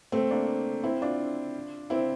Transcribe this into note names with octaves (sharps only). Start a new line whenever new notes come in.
A3 C4
A#3 D4
C4 E4
D4 F4
C4 E4